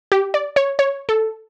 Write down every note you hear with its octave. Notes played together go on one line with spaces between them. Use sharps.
G4
D5
C#5
C#5
A4